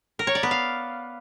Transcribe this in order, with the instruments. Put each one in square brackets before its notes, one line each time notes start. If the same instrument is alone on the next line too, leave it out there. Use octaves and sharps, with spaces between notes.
[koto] A#4
C#5
D5
B3
F5